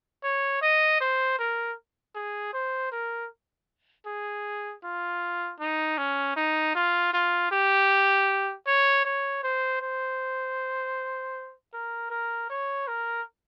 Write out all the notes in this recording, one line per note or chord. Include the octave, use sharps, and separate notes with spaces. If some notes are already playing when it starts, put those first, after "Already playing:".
C#5
D#5
C5
A#4
G#4
C5
A#4
G#4
F4
D#4
C#4
D#4
F4
F4
G4
C#5
C#5
C5
C5
A#4
A#4
C#5
A#4